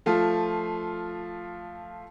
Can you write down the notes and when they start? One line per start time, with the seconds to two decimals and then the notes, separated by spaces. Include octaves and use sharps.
0.06 F3 A3 F4